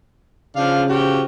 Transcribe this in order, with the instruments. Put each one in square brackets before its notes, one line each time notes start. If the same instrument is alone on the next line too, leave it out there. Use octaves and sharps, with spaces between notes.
[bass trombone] C#3 [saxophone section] F3 D4 F5
[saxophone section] F3 F#4 G4